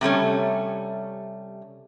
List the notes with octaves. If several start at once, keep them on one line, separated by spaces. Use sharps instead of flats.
C3 G3 A3 C#4